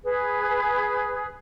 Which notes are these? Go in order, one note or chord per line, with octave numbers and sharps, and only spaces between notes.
G#4 B4